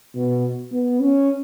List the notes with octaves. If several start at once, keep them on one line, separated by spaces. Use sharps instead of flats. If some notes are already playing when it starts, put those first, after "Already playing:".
B2
B3
C#4